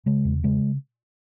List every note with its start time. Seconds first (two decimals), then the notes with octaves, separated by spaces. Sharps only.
0.06 C#3 G#3
0.25 E2
0.44 C#3 G#3